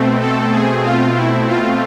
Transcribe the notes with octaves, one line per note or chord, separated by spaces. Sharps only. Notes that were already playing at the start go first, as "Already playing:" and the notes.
Already playing: B2 A3 C4
A4
G#4
F4
E4
F4